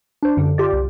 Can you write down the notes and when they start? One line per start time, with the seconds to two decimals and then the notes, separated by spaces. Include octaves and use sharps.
0.23 D4 C5
0.37 F#2 D3
0.58 F4 G4 D5
0.73 C2